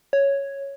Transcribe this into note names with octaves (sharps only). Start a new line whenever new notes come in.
C#5